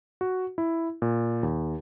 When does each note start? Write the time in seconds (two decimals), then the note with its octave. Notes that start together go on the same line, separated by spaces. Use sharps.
0.21 F#4
0.58 E4
1.02 A#2
1.43 D#2